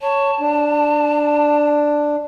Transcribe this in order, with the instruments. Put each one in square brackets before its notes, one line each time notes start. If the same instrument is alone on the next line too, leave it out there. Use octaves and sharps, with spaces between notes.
[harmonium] C#5 [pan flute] A5
[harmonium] D4